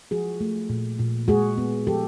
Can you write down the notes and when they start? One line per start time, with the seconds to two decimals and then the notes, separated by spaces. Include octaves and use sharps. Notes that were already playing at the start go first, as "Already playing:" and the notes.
0.11 F3 F#4 G#4
0.40 A3
0.69 A#2
0.99 A#2
1.28 G#3 F#4 G#4
1.58 B3
1.87 F3 G4 A4